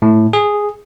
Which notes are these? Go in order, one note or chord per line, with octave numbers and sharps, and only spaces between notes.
A2
G#4